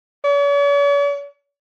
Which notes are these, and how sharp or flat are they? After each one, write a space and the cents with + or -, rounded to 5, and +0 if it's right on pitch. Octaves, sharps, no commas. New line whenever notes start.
C#5 +45